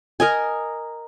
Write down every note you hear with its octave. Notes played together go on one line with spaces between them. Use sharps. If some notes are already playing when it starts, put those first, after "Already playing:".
A#4 D#5 G#5